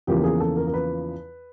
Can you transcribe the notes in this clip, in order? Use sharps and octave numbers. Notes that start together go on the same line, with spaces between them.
E2 C#3 F3 A#3 G4
G#4
A4
A#4
A#4
B4